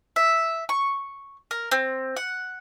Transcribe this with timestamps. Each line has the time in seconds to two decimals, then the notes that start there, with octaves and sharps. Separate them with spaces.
0.16 E5
0.69 C#6
1.51 A#4
1.71 C4
2.16 F#5